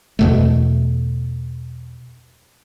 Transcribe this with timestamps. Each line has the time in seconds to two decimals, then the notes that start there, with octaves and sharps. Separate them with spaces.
0.19 E2 B2 A3